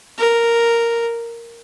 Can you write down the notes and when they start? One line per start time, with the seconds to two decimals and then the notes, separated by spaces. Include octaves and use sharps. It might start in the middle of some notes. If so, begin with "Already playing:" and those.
0.18 A#4